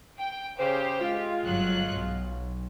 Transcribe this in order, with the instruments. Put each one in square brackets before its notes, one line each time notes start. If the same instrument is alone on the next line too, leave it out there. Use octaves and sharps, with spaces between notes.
[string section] G5
[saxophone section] C#3 C5 [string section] G4
[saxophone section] G#3 F4
[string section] G1 F#3 F#6
B1